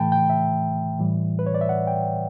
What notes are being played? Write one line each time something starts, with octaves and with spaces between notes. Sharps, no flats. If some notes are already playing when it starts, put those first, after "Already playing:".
Already playing: A2 E3 A3 G5 A5 B5
G5
E5
A2 E3 G3
B4
C#5
D5
E5
F#5
G5